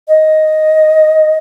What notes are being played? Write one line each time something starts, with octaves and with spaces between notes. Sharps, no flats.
D#5